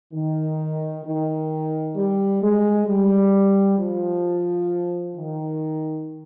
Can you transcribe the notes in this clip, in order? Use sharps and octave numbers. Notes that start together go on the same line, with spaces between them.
D#3
D#3
G3
G#3
G3
F3
D#3